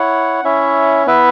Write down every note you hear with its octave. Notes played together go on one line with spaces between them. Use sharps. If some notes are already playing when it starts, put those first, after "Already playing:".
Already playing: E4 C#5 F#5
C#4 E4 C#5 E5
B3 E4 B4 E5